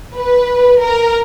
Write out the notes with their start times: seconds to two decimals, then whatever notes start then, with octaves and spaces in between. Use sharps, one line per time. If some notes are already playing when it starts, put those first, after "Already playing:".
0.15 B4
0.80 A#4